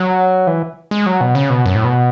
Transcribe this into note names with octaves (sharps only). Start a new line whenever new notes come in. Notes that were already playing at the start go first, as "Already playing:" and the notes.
Already playing: F#3
E3
G#3
F#3
B2
C#3
B2
F#2
A2
B2